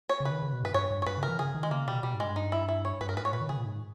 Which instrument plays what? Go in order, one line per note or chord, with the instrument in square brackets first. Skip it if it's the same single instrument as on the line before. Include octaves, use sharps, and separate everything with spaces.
[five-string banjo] C#5
[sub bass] C#3
[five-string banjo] B4
[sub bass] D#3
C#3
B2
[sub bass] G2 [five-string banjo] B4
[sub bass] G2 [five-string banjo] C#5
[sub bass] G2
[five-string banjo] C#5
[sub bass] G2 [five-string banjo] B4
[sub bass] C#3
[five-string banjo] A#4
[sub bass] E3
[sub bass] C#3 [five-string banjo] G#4
[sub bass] D#3
[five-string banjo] G#3
[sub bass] C#3 [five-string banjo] A#3
[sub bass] B2 [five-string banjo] G3
[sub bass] B2 [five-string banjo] G3
[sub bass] G#2
[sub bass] G2 [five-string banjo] G#3
[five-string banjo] D#4
E4
E4
C#5
[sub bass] G2 [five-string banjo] B4
[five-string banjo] A#4
[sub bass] G#2 [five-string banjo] B4
[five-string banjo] C#5
[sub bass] A#2 [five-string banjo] B4
[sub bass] D#3
[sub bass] C#3 [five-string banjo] G#4
[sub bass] A#2
G#2